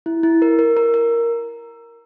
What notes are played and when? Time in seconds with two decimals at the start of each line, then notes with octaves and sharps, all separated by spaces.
0.06 E4
0.23 E4
0.42 A#4
0.59 A#4
0.77 A#4
0.94 A#4